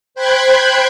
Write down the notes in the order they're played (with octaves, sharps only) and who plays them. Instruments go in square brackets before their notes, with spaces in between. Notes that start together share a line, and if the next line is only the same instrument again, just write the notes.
[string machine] C5 G5 B5 F#6 G#6